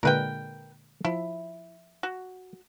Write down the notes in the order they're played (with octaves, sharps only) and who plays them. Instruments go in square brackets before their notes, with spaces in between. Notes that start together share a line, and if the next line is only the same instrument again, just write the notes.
[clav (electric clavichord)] A#2 D3 G#3 [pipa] A#4 B4 G5
[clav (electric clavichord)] F3 [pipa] E4
[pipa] F#4